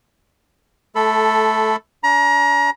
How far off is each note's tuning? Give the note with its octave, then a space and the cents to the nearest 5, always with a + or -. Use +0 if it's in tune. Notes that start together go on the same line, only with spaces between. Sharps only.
A3 -20 A4 +0 B5 +10
D4 -45 A#5 +30